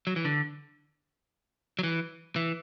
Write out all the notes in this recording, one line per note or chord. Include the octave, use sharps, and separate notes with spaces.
F#3
E3
D3
F#3
E3
E3